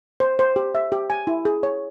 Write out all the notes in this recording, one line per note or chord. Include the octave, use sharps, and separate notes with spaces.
C5
C5
G4
E5
G4
G#5
E4
G#4
C#5